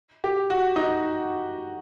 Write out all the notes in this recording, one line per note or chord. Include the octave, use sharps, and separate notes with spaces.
G4
F#4
D#4